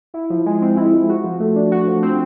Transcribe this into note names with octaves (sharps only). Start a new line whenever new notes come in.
E4
F3
G#3
C4
E4
F3
F#4
F3
A3
D4
F#4
F3
C4